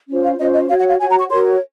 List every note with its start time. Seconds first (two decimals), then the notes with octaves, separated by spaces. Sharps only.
0.09 C#4 F4 C5
0.24 F5
0.39 C#4 F4 C5 D#5
0.54 D#5
0.68 F#4 C#5 F5
0.79 F#5
0.89 F5
0.99 F#4 C#5 G#5
1.09 A#5
1.19 C#6
1.29 F#4 A#4 C#5 C6